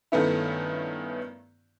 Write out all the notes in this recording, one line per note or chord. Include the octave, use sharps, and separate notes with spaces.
G2 D#3 A3 B3 C#4 E4